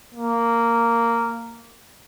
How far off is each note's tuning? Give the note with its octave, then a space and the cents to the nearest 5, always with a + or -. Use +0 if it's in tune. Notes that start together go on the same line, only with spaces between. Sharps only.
A#3 -10